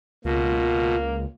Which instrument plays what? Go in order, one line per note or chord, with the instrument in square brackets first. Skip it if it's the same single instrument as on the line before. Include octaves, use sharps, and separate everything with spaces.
[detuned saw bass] C#2 [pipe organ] B2 [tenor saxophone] A#3 [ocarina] F4